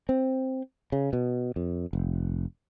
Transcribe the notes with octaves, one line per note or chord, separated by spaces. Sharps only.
C4
C#3
B2
F2
F1